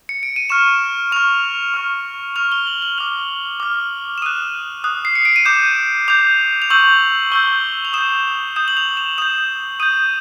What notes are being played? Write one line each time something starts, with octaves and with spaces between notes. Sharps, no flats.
C#7
D7
D#7
C#6 F6 E7
C#6 F6 F7
C#6 F6
C#6 F6 F7
G7
F#7
F#7
D6 F6 F7
D6 F6
E7
D#6 F#6 D#7
D#6 F#6
C7
C#7
D7
D#7
D6 G6 E7
D6 G6 F7
F7
C#6 E6 G6 F#7
C#6 E6 G6 G7
F7
D#6 G6 E7
D#6 G6 E7
F#7
F7
E7
D#6 G6 E7
D#6 G6 D#7